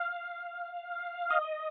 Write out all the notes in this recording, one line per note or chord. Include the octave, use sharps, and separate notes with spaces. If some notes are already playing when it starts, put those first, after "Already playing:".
Already playing: F5
D#5